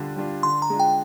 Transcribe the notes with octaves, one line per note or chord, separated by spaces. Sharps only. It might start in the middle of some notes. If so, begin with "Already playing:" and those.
Already playing: D3 G3 D4 F4
G3 D4 F4
D3 C6
A#5
G#3 D4 F4
G5